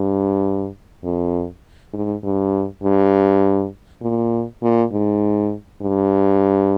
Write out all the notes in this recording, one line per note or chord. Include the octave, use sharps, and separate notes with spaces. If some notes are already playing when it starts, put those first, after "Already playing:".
Already playing: G2
F2
G#2
G2
G2
A#2
A#2
G#2
G2